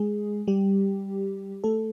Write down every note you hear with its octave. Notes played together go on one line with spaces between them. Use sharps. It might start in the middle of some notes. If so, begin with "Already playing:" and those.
Already playing: G#3 G#4
G3 G4
A3 A4